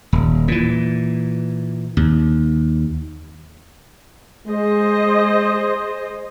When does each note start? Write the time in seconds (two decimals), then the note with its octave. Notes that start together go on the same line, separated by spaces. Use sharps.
0.13 D#1
0.48 A#2 E3
1.97 D#2
4.47 G#3 G#4 C5 D#5